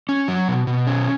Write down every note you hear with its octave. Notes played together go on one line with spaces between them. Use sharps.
C#4
F#3
B2
B2
C#4